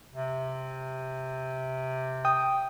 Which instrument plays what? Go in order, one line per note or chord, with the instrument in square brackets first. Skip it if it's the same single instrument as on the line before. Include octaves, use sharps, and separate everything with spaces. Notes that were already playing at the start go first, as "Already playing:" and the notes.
[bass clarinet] C3
[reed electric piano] G5 D#6